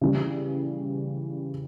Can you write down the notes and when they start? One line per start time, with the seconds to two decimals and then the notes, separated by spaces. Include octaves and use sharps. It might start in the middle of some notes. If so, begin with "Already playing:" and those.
0.01 C#3 E3 G3